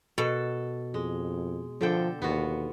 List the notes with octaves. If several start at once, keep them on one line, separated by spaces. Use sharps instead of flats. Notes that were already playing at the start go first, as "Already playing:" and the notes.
B2 A4
F2 G#3
D3 F3 A4 G5
D#2 B3 F4 F#4